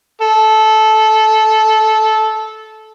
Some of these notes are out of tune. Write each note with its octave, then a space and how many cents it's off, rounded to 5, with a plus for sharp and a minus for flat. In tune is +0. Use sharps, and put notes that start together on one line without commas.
A4 -15